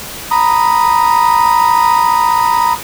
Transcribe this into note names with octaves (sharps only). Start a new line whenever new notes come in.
A#5 B5 D#6